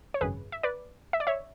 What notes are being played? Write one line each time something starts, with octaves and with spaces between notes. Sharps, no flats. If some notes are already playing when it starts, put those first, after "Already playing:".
C#5
G#1 F#2 C#3 G#4 B4
E5
B4 D5
E5
D5
C#5 E5